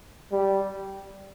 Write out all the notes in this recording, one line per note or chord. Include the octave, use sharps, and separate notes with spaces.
G3